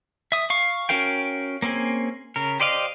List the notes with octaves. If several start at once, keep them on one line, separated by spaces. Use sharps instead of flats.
E5 D#6
F5 C#6
C#4 F#4 A#4 F5 G5
A#3 C4 C#4 G#4
C#3 A#4
G4 C5 D5 D#5 F5